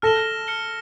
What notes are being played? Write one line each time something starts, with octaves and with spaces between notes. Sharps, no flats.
A4 F6 A#6 E7 G7
F6 C#7 G7